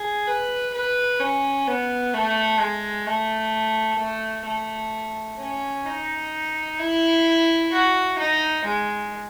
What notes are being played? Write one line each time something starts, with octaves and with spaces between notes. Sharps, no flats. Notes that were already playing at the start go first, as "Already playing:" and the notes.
Already playing: G#4
B4
B4
C#4
B3
A3
G#3
A3
A3
A3
C#4
D#4
E4
F#4
D#4
G#3